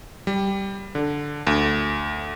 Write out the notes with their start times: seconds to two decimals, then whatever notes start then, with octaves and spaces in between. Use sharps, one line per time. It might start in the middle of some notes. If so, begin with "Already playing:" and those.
0.27 G3
0.95 D3
1.47 D2